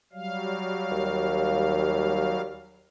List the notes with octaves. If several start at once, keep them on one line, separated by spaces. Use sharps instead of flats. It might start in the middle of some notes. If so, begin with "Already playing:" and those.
F#3 G3 F5
D#2